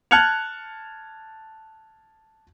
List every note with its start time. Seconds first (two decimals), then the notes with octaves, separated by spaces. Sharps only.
0.11 A5 F6 F#6 G#6 C#7 F7